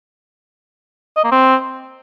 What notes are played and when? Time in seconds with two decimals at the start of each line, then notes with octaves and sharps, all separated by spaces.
1.17 D#5
1.24 A#3
1.32 C4